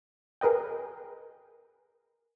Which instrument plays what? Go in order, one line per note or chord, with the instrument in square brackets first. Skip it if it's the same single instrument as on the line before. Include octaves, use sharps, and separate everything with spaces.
[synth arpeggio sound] G#4 A#4 B4 D#5 G5